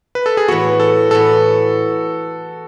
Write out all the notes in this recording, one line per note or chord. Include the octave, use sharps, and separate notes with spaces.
B4
A4
G#4
A2 E3 B3 F#4
A4
A2 E3 B3 A4